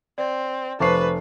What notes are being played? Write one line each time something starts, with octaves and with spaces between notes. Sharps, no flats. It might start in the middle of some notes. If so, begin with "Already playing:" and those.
C4 D5
F1 B4 C5 A5 C#6 D6 C7